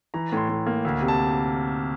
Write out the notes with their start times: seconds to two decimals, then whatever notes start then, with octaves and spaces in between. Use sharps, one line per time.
0.14 E3 A#5
0.32 A2 C6
0.49 A2
0.67 A#3
0.85 D2
1.01 C3
1.08 A5